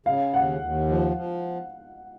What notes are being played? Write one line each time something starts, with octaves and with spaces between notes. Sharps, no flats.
C#3 F5
D#2 F#5
D#2
F3
F3